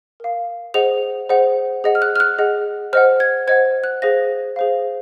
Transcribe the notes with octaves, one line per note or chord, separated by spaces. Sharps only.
A#4 F5
G#4 C5 D#5 F#5 F7
G#4 C5 D#5 F#5
G#4 D#5 F#5
F6
F#6
F6
F#6
G#4 D#5 F#5
C5 D#5 F#5 F6
G#6
C5 D#5 F#5 G#6
F#6
G#4 C5 F5 A#6
G#4 C5 F5